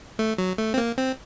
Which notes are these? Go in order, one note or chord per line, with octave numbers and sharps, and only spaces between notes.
A3
F#3
A3
C4
A#3
C4